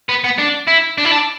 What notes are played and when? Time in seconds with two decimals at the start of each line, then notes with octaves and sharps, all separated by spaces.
0.09 B3
0.24 B3
0.38 D4
0.68 E4
0.98 D4
1.05 E4
1.12 D4